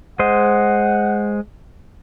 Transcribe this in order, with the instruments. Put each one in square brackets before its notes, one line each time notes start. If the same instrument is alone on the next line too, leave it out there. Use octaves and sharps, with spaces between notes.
[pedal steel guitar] G#3 C5 D#5 [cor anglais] F#5